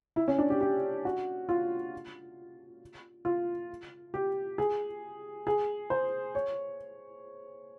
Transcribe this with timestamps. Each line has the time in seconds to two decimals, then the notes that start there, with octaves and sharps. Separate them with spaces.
0.16 E4
0.28 C#4
0.38 D4
0.50 G4
0.61 G4
1.05 F#4
1.49 F4
3.25 F4
4.14 G4
4.58 G#4
5.47 G#4
5.90 C5
6.35 C#5